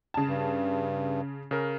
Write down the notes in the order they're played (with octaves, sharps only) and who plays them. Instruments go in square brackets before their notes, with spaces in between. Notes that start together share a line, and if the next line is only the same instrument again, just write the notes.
[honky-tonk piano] C#3 A5
[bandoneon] G2
[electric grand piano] C#3 A#4